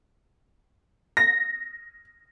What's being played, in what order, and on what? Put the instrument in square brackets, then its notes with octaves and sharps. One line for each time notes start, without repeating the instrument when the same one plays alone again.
[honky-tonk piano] A#6